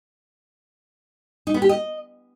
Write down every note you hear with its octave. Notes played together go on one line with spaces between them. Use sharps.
D#4
B3
G4
D#5